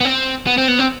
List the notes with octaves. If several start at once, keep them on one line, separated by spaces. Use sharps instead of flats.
B3
C4
B3
C4
B3
C4